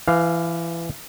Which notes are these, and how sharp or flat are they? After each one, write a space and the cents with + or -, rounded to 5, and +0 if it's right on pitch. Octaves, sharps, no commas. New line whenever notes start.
E3 +25 F5 +0